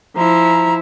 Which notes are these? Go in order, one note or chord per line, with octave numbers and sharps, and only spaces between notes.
F3 E4 A#5